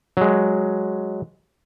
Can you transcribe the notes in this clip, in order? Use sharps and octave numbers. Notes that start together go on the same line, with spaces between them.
F#3 G#3